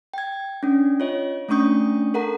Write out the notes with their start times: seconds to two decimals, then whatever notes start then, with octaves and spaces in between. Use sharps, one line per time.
0.14 G5 G#6
0.63 C#4 D4
1.00 F4 C#5 D#5
1.49 A3 C#4 D4 C#6 D#6 G6
2.14 A4 A#4 F#5 A#5